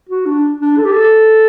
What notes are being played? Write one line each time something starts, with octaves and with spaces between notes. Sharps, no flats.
F#4
D4
D4
A4
G4
A4